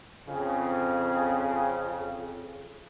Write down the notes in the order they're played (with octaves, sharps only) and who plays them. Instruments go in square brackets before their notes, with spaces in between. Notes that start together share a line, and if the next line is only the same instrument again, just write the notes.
[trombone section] F2 C#3